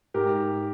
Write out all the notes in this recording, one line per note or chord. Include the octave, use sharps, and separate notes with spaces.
G#2 G4 A#4